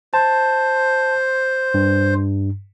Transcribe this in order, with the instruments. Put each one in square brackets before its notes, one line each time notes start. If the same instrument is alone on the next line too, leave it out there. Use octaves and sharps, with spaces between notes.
[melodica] C5 [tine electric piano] A5
[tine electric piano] G2